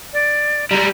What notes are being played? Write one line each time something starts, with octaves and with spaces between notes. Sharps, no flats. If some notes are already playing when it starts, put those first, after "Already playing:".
D5
G3 G#3 A#5